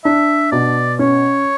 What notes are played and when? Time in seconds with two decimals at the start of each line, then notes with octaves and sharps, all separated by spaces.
0.05 D4 E5
0.52 B2 D5
0.99 C#4 C#5